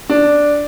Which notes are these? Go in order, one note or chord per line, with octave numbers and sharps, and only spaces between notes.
D4